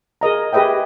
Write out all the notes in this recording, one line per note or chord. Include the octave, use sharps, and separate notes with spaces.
G#4 A#4 D#5 A#5
G4 G#4 B4 D#5 E5 G5